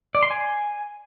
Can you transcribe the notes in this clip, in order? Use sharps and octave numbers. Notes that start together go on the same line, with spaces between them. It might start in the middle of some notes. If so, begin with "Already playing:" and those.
D5
C6
G#5